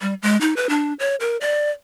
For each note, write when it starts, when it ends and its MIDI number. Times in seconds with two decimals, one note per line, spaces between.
0.01 0.14 55
0.22 0.39 56
0.41 0.56 63
0.56 0.69 71
0.69 0.93 62
0.99 1.15 73
1.20 1.37 70
1.41 1.70 74